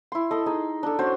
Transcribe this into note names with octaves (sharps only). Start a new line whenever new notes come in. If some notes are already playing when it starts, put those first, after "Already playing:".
E4 C6
A4 D#5
D#4 G#4
D4 A4
C#4 F#4 C5